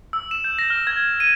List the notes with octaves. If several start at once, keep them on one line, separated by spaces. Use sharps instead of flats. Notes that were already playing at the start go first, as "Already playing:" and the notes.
E6
E7
G6
A#6
F6
G#6
D#7